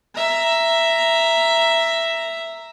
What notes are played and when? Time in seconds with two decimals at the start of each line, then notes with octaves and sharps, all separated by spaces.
0.15 E5 A#5